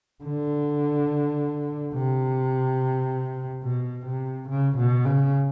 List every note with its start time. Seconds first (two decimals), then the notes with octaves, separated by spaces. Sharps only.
0.24 D3
1.94 C3
3.64 B2
4.06 C3
4.49 C#3
4.77 B2
5.05 C#3